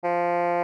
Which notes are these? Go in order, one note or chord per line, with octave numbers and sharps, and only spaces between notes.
F3